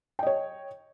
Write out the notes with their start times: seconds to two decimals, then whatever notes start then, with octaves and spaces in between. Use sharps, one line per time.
0.19 G5
0.23 D#5
0.27 C#5